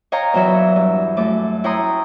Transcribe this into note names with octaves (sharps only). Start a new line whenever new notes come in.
C#5 D#5 F5 G5 A#5
E2 E3 F#3 C#5 E5
G2
F#2 A3 D6
E4 C#5 G5 A#5 C6 D#6